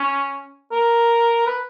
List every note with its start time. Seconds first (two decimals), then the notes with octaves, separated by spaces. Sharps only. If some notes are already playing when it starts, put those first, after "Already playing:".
Already playing: C#4
0.72 A#4
1.47 B4